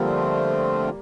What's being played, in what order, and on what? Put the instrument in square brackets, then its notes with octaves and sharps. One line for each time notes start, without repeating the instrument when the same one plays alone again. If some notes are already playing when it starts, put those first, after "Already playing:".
Already playing: [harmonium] D3 F3 A3 C4 F4 [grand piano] G3 A#3